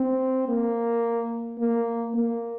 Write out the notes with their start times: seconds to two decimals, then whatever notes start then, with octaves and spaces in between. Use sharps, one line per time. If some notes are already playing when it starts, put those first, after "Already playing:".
Already playing: C4
0.49 A#3
1.59 A#3
2.14 A#3